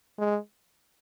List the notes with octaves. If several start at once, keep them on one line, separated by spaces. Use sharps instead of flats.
G#3